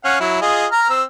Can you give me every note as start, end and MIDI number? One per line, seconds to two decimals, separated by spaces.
0.05 0.16 61
0.05 0.16 77
0.05 0.16 78
0.20 0.39 54
0.20 0.39 64
0.41 0.66 65
0.41 0.66 68
0.41 0.66 75
0.71 0.89 82
0.71 0.89 89
0.90 1.03 60
0.90 1.03 88